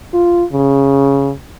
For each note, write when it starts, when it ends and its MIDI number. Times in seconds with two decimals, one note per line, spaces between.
0.13 0.44 65
0.52 1.31 49